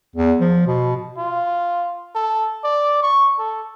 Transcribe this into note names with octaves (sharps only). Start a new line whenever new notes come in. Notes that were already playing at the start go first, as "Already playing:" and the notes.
E2
F3
B2
F4
A4
D5
C#6
A4